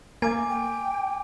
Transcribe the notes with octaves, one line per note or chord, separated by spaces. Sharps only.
A#3 G#5 D6
G5